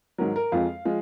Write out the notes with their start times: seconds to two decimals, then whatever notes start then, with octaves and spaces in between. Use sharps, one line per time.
0.18 G#2 D#3 F#3 A#4
0.36 A#4
0.52 F2 F3 G#3 F5
0.85 F3 G#3